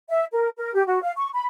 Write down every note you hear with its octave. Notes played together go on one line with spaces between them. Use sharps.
E5
A#4
A#4
G4
F#4
F5
C#6
B5